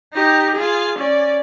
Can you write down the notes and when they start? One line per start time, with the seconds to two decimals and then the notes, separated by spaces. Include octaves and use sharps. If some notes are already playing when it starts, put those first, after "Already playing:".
0.13 D#4 G4
0.56 F4 G#4
0.98 C#4 D5